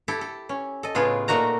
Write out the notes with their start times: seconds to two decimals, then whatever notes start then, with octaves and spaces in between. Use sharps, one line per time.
0.08 E4 G4 A4
0.21 A4
0.49 C#4
0.83 A4 D#5
0.95 A2 C#3 B3 F4 G#4 A4
1.28 A#2 A3 A#3 D#4 F#4 A#5